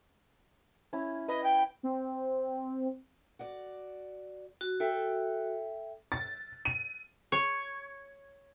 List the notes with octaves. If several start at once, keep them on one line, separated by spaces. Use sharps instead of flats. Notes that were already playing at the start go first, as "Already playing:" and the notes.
C#4 E4
B4 D#5
G5
C4
F#4 D5
F#4
A4 E5 G5
A6
D#7
C#5